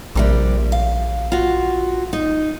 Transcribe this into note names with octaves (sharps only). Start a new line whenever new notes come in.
A#1 C3 G3 A#3
F5
F4 F#4
D#4